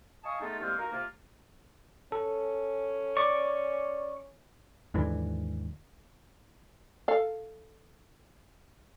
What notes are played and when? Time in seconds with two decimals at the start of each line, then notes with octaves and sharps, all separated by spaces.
0.24 D#5 F5 G#5 A5 C#6 D#6
0.41 G#3 A3 B3 D#4 F4 A4
0.61 C2 G#3 A#3 C4 C5 F6
0.78 A#3 D#4 F#4 A#4
0.92 C3 A#3 F4
2.12 C#4 A4
3.17 D5 C#6 D6
4.94 D#2 G#2 D3 E3
7.08 A4 F5